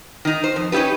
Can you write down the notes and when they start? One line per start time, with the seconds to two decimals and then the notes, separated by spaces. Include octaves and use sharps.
0.25 D#3 D#4
0.44 C5
0.56 F2
0.72 C#4 D#4 E4 G4 B4